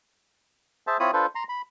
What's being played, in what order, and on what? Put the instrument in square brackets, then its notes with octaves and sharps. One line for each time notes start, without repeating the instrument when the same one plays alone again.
[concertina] G#4 C5 E5 A5
C4 E4 F4 C#5 B5 D#6
D4 F4 A4 B4 C5
A#5 C6
B5